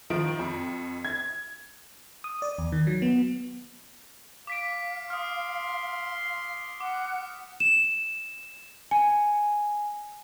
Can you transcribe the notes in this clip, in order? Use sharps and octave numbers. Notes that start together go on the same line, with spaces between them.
D#3 F3 D7
F2
G#6
D#6
D5
E2
D#3
F#3
B3
F5 D6 B6 D7
C6 D#6 F6
F#5 D6
E7
G#5